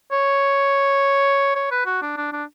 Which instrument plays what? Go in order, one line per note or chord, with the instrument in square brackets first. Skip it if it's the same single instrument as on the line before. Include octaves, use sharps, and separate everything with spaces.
[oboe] C#5
C#5
B4
F#4
D4
D4
D4